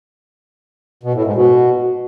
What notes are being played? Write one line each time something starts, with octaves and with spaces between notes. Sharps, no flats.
B2
A2
G#2
B2